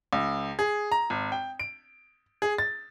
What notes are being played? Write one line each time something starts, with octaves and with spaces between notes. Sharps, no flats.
C#2
G#4
A#5
G#1
G5
D7
G#4
A6